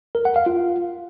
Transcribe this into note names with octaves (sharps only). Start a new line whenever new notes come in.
A#4
F#5
F5
F4